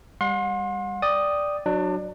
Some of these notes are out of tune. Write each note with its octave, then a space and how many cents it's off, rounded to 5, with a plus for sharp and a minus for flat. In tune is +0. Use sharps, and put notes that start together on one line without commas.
G3 +25 F#5 -40 C6 +25
D5 +0 G5 +0 D#6 -5
F#3 +0 D4 +30